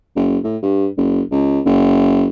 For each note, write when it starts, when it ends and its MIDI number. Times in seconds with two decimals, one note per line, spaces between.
0.16 0.38 30
0.44 0.57 45
0.63 0.87 43
0.97 1.22 30
1.32 1.60 37
1.65 2.28 30